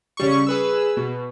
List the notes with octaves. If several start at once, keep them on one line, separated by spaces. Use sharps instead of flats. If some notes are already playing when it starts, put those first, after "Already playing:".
C#3 G3 C#6
G#4 B4 E6
B2